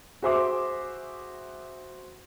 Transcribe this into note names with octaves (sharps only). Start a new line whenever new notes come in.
F#4 G#4 C5 E5 D6